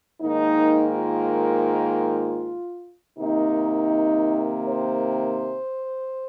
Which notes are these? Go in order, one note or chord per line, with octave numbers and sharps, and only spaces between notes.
G#2 D#3 A#3 D#4
F4
C3 D#3 A#3 D#4
C5